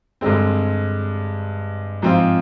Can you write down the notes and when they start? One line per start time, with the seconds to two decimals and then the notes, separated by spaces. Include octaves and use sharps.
0.21 G2 D3 G#3 C4
2.02 G#2 F3 C4 F4